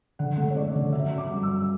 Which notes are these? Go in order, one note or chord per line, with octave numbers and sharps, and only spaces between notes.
D3 F#5
A3 F#5
C#5
A3 D5
D3 D5
F#3 E5
C#4
D6
G2
E6
F#3